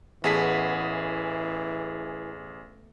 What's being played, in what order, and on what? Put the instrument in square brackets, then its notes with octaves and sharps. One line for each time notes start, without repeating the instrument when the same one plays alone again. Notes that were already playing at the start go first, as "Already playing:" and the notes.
[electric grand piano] A1 G#4 B6 [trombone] E3 [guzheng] A3 B3